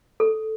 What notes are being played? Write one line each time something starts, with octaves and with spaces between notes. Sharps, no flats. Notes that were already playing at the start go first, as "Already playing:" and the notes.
A4